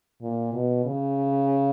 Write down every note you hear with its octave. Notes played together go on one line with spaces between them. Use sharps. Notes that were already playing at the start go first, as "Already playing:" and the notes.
A#2
B2
C#3